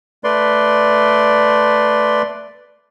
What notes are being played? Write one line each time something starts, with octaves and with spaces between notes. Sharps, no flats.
A3 B4 D5 C6